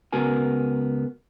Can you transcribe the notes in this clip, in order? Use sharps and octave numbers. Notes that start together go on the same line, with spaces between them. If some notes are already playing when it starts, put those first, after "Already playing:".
C#2 B3 F#4 A#4 G#5